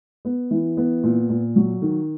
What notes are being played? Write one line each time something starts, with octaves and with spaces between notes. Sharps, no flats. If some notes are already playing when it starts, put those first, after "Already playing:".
B3
E3
B3
A#2
A#2
F#3
D#3